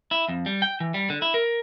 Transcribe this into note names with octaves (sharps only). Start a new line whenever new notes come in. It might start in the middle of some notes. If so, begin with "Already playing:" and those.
E4
F2
G3
G5
E3
G3
D3
E4
A#4